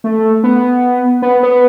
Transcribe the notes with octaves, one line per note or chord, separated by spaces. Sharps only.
A3
B3
B3
B3